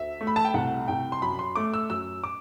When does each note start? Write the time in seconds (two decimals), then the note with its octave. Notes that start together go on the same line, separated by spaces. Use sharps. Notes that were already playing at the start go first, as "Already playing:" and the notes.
Already playing: D2 E5
0.21 A3
0.27 B5
0.36 A5
0.45 G5
0.54 C2 F#5
0.88 C2 G5
1.12 C6
1.22 F#2 B5
1.39 C6
1.55 A3 D6
1.74 E6
1.90 F#2 E6
2.24 D6